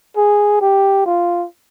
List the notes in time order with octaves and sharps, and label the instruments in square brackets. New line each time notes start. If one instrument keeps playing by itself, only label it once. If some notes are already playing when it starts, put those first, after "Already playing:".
[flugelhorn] G#4
G4
F4